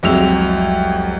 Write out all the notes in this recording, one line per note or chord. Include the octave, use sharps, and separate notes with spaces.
C2 F2 F#3 G#3 E6 F7